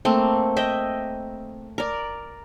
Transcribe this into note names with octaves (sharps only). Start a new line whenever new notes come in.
A3 A#3 C4
D#5 E5 G5
A#4 D5